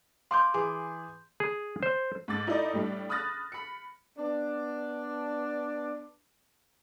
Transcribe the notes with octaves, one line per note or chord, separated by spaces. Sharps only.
F5 C6 D6 G6
E3 G#4 D6
G#4
C5
G#2 D6 A6
D#4 E4 A4 D5 D#5
A2 G3 D4
B5 D#6 F6 F#6 A6 A#6
B5 C#7
B3 D4